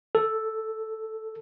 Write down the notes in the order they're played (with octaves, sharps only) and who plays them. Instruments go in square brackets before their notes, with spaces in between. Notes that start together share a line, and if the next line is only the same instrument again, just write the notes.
[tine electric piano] A4